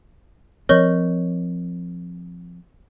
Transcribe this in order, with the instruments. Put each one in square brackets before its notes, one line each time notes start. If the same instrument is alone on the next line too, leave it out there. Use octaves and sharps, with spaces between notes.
[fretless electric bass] F3 C4 [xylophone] A#4 D#5 C#6 [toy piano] C#5